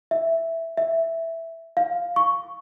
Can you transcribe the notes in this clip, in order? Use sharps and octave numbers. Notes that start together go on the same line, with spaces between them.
E5
E5
F5
C#6